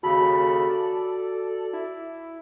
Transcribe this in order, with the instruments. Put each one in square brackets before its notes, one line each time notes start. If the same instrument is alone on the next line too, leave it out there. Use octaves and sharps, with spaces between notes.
[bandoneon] D#2 C#3 B5 [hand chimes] F#4 [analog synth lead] A4
[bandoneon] D5
[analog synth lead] E4